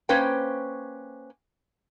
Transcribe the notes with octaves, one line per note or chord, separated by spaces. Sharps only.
A#3 C#4 B4 C5 G5